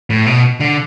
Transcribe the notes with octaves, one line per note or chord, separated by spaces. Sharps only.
A2
B2
D3